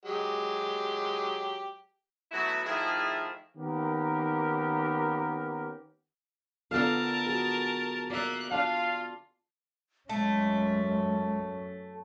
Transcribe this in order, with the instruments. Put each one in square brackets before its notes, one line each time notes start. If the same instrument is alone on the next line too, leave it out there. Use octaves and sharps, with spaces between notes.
[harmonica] F#3 G#3 G4
[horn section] F#3 A3 B3 E4 F#4
D#3 F3 A3 E4 G#4
[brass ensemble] D#3 A#3 B3 C#4 G4 A#4
[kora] D3 F5 [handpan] B3 F4 A4 [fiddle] A#4 A5
[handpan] F#4 G#4
[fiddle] A#3 F#6 [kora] D5 E5
[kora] D4 [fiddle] F4 [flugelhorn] F5
[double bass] F#2 C#4 [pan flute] G#3 [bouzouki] A3